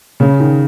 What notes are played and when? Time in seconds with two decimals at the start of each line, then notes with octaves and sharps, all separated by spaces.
0.20 C#3
0.40 D#3